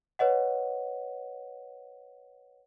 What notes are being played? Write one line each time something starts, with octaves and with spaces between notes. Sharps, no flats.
B4 C#5 D#5 F#5